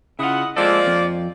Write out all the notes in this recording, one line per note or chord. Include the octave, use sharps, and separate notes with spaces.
C#3 E4 F4 D#5 F#5
F3 G#3 A#3 C4 A4 D5
F2